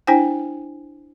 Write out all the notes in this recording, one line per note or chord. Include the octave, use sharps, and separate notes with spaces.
D4 E4 C5 G5 G#5